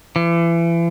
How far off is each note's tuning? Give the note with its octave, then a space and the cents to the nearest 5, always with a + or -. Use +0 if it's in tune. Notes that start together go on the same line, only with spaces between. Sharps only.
E3 +35